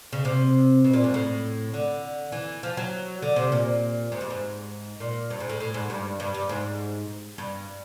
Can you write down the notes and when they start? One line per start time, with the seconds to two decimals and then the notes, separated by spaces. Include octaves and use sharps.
0.12 C#3
0.25 C3
0.84 B2
0.93 A#2
1.04 G#2
1.14 A2
1.73 D3
2.32 E3
2.63 F3
2.77 F#3
3.22 D3
3.36 C3
3.52 A#2
4.12 G#2
4.21 G2
4.30 G#2
5.00 A#2
5.30 G2
5.40 G#2
5.49 A2
5.60 A2
5.74 G#2
5.90 G2
6.20 G2
6.34 G2
6.49 G#2
7.38 G2